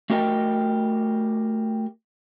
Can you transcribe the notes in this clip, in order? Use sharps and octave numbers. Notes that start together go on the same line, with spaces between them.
A3 F#4 G4 A#4 D#5 G5